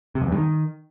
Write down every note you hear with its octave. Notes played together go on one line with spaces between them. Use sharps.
C3
F2
E2
G2
D#3